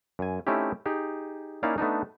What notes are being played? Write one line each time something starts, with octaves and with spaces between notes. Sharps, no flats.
F#2 G#5
A3 C4 C#4 D#4 E4 G4
D#4 G4 G#4
A#3 C#4 D#4 E4 D5 F5
A3 B3 D4 D#4